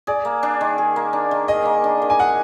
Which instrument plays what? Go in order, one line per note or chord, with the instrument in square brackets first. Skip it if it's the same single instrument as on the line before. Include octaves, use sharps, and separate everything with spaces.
[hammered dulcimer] G#4 [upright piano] D5
[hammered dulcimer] A#3
D4
D#3
G#4
A#3
D4
D#3
[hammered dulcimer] G#4 [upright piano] D#5
[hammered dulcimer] A#3
D4
D#3
[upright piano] G#5
[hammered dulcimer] G#4 [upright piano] F#5